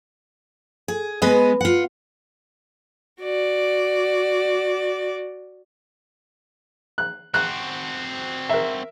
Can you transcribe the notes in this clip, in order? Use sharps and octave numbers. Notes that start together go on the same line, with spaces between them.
G#4
G#3 B3 B4 D#5
F4 F#5
F#4 D5
F#6
C4 F#4 F#6
A#4 E5